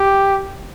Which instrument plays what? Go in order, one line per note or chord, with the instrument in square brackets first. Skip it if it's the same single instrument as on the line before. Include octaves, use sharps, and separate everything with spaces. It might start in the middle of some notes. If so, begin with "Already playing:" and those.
Already playing: [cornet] G4